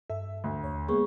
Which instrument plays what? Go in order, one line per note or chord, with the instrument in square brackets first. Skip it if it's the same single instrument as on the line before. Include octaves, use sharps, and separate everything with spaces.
[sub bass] G2 [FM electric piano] A4 [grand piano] E5
[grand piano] D2
[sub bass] D#2 [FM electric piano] C#5
[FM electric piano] G#3 A#3 B3 [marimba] G#4 C#6